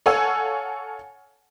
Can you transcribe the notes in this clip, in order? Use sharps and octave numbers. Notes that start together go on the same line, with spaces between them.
A4 C#5 F5 F#5 G#5 E6